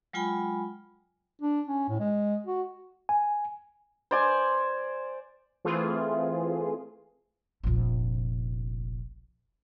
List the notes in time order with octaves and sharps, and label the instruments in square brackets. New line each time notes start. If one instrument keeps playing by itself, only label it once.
[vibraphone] F#3 G#3 F4 G5 G#5 B5
[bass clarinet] D4
C#4
A2
G#3
F#4
[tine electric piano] G#5
[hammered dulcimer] C5 D5 G#5
[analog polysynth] E3 A3 C4 F4 G#4
[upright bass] F1 A#1